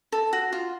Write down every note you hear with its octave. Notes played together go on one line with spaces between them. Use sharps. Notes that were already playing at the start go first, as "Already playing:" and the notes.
A4
F#4
F4